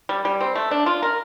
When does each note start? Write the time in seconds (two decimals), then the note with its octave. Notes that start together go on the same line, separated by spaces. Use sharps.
0.09 G3
0.25 G3
0.41 C4
0.55 A3
0.71 D4
0.86 F4
1.02 A#4